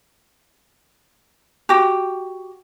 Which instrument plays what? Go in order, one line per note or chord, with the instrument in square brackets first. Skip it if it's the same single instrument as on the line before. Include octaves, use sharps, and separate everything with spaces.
[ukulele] F#4 G4